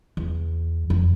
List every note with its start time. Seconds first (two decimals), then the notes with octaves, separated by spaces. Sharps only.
0.17 E2
0.90 F2